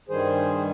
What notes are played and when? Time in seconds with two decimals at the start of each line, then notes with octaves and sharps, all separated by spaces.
0.09 G2 D#3 G3 G#4 C5